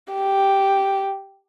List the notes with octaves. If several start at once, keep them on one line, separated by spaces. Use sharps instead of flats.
G4